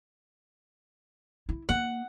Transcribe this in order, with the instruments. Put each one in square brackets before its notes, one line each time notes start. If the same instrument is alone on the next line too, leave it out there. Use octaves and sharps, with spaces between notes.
[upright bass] E4
[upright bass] A#3 [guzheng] F#5